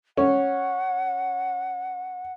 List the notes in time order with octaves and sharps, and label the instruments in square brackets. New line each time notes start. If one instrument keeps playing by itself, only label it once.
[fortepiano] C#4 [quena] F#5